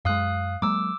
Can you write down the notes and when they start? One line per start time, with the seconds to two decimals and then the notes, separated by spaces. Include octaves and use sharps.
0.05 F#2 G#3 F5 D#6 F#6
0.62 F#3 G#3 A#3 D6 E6